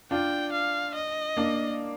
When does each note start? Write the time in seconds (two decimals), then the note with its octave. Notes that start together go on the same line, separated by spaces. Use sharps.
0.11 D4 F4 G5
0.53 F5
0.95 D#5
1.37 A#3 D4